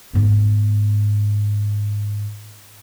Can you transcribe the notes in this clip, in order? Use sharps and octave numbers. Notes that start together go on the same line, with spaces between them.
G#2 B3